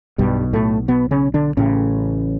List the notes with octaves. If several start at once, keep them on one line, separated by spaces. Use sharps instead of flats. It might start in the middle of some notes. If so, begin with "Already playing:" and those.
B1 G2 B2 G3
A2 A3
B2 B3
C#3 C#4
D3 D4
A1 A2 C#3 C#4